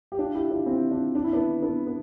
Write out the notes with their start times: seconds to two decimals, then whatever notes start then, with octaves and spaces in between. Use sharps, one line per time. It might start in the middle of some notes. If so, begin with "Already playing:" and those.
0.12 G4
0.18 D4 F4
0.35 E4 G4
0.51 D4 F4
0.66 C4 E4
0.91 D4 F4
1.15 D4
1.24 E4
1.33 B3 D4
1.62 B3 D4
1.87 B3